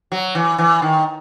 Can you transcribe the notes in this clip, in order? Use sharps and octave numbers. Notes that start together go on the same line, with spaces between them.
F#3
E3
E3
D#3